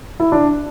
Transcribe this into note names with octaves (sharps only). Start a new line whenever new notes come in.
E4
D4